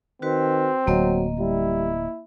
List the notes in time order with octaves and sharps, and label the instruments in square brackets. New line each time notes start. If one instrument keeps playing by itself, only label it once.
[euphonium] D#3 [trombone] C4 [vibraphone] F#4 B4
[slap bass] D1 [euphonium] F#3 [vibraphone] A#3 D#5
[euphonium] G3 [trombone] E4